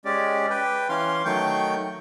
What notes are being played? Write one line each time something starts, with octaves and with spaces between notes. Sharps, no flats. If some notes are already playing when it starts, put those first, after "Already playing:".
G#3 C#4 G4 D5
B4 G5
E3 C#4 F5 C6
D#3 F#3 A3 G5 C#6 G6